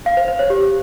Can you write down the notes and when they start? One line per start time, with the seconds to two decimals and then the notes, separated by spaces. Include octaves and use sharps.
0.06 F5
0.17 C5
0.28 C5
0.39 C#5
0.50 G4